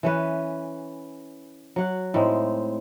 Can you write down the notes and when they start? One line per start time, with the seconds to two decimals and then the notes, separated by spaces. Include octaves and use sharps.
0.03 E3 C#4 B4
1.76 F#3 F#5
2.14 A2 G#3 C4 D#4